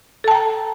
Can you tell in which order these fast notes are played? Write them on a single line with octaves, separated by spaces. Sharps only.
A4 A5 G5 A#5